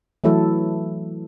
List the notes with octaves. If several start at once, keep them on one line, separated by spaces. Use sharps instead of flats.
E3 F#3 A3 E4 A4